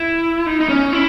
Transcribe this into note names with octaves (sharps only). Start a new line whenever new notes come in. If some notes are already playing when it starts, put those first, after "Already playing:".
Already playing: E4
D#4
D#4
C#4
E4